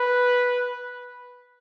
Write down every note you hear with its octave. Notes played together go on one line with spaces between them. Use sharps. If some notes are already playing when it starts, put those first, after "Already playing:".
Already playing: B4